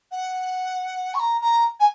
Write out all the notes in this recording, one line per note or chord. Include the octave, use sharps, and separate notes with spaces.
F#5
C#6
A#5
A#5
G#5